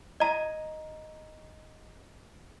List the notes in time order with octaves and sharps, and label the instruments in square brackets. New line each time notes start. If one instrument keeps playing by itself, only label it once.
[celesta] D#5 A#5